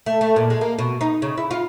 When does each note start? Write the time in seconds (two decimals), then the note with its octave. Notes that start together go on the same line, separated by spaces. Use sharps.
0.06 A3
0.21 A3
0.36 A#2
0.50 G#3
0.61 A#3
0.79 B2
1.01 D#4
1.22 C#3
1.38 E4
1.51 F4